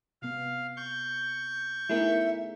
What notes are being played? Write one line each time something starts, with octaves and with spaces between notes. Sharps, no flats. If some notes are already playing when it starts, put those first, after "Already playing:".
C3 B3 F5
C#6 G6
A3 B3 D#4 E4 G#4 A#4 E5